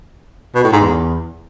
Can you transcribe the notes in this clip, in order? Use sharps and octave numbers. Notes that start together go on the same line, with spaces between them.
B2
A2
G#2
E2